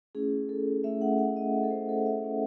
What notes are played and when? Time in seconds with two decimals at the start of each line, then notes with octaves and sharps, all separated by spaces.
0.15 A3 C#4 E4 G#4
0.49 A4
0.84 A3 C#4 E4 E5
1.01 F#5
1.18 F#5
1.37 D#5
1.53 A3 C#4 E4
1.64 A4
1.71 C5
1.89 A4
2.06 E5
2.23 A3 C#4 E4